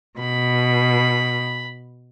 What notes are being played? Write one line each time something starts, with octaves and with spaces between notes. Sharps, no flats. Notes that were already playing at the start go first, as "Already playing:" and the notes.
B2 B5